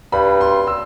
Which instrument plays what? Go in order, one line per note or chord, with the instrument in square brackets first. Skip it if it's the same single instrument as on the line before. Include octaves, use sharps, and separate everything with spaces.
[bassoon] G2 [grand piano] B5
[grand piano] C6
E6